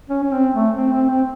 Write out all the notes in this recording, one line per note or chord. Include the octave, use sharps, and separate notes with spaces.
C#4
C#4
C4
A3
C4
C4
C4